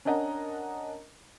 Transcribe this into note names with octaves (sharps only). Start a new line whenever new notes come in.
C#4 D4 A#4 D#5 F#5 A#5